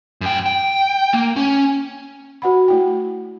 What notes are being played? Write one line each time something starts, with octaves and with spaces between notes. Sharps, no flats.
F#2 G5
G5
A#3
C#4
F#4 F#5 B5
A3 E4 G5